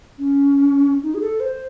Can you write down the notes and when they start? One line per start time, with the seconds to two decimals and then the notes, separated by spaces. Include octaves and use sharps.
0.19 C#4
1.03 D#4
1.14 G#4
1.21 A4
1.40 C5